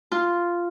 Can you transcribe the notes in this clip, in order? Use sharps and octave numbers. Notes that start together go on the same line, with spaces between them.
F4